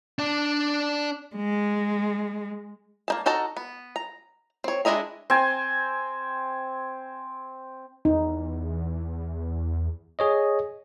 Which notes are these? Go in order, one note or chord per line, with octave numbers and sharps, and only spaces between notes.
D4 D5
G#3
A#3 D#4 A5
D#4 F#4 A4 A5 A#5
B3
A#5
C4 C#5
G#3 D4 E4 D#5 A#5
C4 G#5
E2 D#4
G#4 C#5 D#5